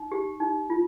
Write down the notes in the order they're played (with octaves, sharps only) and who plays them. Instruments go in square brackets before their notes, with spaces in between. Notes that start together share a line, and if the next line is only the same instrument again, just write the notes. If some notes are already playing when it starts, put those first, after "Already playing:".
Already playing: [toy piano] D#4
G4
D#4
F4